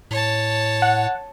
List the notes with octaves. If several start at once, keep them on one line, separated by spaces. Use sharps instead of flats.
A2 C#5 A5
F#5